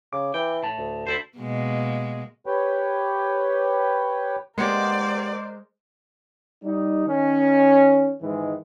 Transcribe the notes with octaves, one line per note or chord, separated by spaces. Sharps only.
C#3 D6
E3 G5
A2 A5
D2
D2 E4 A4 C5
B2 G#3 A#3
G4 B4 C#5 G5
G#3 A#3 B3 G4 A#4 C5 D5
G3 D#4
D#3 C#4
G#2 D#3 E3 G#3